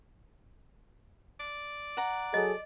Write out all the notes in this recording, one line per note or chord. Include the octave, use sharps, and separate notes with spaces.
D5
F#5 A#5
F#3 G#4 A4 D#5